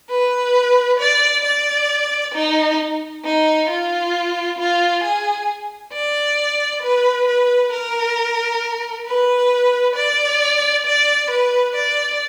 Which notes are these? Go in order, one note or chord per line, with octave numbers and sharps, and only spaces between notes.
B4
D5
D5
D#4
D#4
F4
F4
G#4
D5
B4
B4
A#4
B4
D5
D5
B4
D5